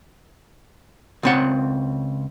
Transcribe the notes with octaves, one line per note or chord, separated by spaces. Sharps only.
C#2 C4 F#5